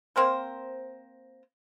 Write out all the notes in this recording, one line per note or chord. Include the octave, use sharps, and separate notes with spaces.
A#3 C4 A#4 C5